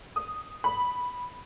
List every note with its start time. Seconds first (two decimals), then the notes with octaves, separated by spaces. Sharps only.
0.16 D#6
0.64 B5